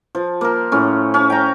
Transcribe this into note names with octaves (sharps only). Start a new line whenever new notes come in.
F3
A#3 A#4
A2 C#4
C#4
G5 A#5